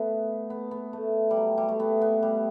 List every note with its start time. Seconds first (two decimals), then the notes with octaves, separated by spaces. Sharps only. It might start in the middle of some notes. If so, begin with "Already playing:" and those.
Already playing: A3 B3
0.50 B3
0.71 B3
0.93 A3
1.31 G3
1.37 F#3
1.58 G3
1.69 A3
1.80 B3
2.02 B3
2.23 G3